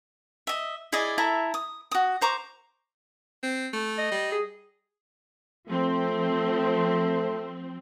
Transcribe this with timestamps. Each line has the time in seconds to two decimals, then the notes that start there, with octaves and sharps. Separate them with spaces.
0.47 D#5 E5
0.92 E4 G#4 D5 D#5
1.18 E4 A4 E5 A#5
1.54 D#6
1.91 F#4 D#6
2.21 C5 A#5 C#6 D6
3.43 C4
3.73 A3
3.98 D#5
4.12 G3
4.32 G#4
5.68 F3 A3 C4